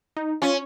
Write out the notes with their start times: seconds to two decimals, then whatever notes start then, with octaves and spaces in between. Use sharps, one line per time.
0.17 D#4
0.42 C#4 F4